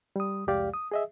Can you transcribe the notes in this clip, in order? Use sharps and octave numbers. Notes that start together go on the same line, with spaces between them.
G3 D#6
C2 F2 G#3 G4 D5 F5
D#6
G#4 D#5 E5